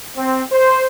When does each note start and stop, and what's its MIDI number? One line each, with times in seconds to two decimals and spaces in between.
0.17 0.42 60
0.51 0.87 72